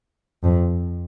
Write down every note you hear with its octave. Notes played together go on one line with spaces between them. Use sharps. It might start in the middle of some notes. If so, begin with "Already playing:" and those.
F2